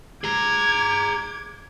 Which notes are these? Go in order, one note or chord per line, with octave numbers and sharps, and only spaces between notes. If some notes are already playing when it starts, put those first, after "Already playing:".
G#4 A#5 D6 G#6